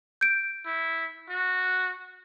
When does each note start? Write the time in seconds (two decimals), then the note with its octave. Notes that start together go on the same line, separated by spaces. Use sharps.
0.21 G6 D7
0.66 E4
1.29 F#4